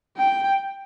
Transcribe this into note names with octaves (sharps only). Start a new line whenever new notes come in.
G5